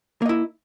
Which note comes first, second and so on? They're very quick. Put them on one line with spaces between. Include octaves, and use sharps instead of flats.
A#3 D#5 E4